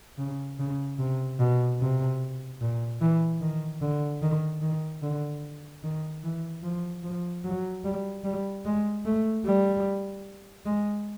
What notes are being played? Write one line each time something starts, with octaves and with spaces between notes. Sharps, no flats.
C#3
C#3
C3
B2
C3
A#2
E3
D#3
D3
D#3
D#3
D3
D#3
E3
F3
F3
F#3
G3
G3
G#3
A3
G3
G#3